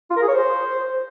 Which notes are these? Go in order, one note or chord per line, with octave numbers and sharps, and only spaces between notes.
F4
A#4
G#4
C#5
C5